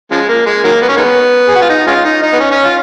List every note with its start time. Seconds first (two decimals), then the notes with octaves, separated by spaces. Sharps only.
0.11 C#3 F3 G#3
0.28 A#3
0.46 G#3
0.64 D#3 F#3 A#3
0.82 B3
0.89 C#4
0.96 D#3 G#3 B3
1.48 G#4
1.55 F#4
1.62 F4
1.69 D#4
1.87 G#3 C#4 F4
2.05 D#4
2.22 D#4
2.33 B3
2.40 C#4
2.51 C#4
2.64 F4